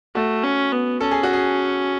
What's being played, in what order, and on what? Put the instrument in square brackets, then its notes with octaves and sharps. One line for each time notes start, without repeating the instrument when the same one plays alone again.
[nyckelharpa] A3 [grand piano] F#4
[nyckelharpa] C#4
B3
[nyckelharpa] C#4 [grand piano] A4
[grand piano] G#4
F#4
G#4